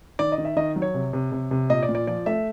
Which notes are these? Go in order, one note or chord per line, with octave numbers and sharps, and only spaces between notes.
D#3 D5
D#5
D#3
E5
D#3 D#5
F#3
C#5
C3
C3
C3
C3
A#2 D#5
D5
A#2
D5
F3 D5
A3 E5